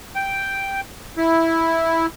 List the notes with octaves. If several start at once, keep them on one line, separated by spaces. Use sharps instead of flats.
G5
E4